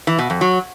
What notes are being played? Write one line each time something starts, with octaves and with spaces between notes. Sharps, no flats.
E3
B2
F2
F#3